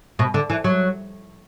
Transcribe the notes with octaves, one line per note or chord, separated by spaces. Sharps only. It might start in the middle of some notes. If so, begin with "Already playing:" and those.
B2
D3
E3
F#3